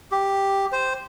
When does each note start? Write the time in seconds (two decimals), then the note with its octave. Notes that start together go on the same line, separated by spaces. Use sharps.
0.12 G4
0.72 C5